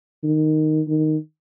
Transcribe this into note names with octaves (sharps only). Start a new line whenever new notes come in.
D#3
D#3